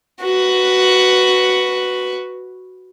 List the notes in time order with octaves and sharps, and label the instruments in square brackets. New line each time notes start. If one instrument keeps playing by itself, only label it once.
[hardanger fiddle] F#4 B4